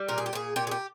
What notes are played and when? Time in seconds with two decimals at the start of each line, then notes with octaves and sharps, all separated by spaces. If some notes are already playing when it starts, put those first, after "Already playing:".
Already playing: G3
0.08 A#2 A#4
0.18 G#4
0.26 G4
0.33 A#2 G#4
0.56 A#2 G4
0.67 G#4
0.71 G4